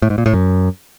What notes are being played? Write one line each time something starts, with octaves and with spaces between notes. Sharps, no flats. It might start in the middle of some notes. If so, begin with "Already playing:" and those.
A2
G#2
A#2
A2
F#2